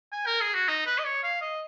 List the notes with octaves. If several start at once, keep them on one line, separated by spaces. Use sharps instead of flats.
G#5
A#4
G#4
F#4
D#4
B4
D#5
C#5
F5
D#5